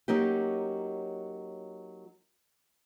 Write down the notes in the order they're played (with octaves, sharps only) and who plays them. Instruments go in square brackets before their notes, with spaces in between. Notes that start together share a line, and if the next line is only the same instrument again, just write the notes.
[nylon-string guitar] F#3 A#3 C#4 D#4 G4